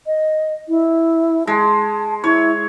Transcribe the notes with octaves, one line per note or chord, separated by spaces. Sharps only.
D#5
E4
G#3 A5
E4 C#5